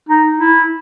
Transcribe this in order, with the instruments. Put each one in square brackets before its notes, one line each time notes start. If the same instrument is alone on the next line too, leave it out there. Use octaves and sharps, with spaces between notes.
[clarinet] D#4
E4